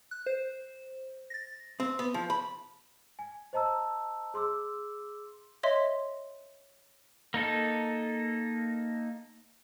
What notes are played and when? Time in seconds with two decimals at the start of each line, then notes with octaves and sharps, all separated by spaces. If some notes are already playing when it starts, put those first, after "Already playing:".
0.11 F#6
0.26 C5
1.30 A6 A#6
1.80 C4
1.99 B3
2.14 F3
2.30 B5
3.19 G#5
3.53 C5 D#5 A5 A#5 E6
4.34 G#4 C6 D6 E6
5.63 C#5 D#5 E5 C6
7.34 A#3 D#4 A4